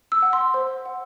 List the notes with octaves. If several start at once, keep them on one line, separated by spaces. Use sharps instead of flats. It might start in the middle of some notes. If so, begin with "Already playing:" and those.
E6
F#5
C6
C5
F#5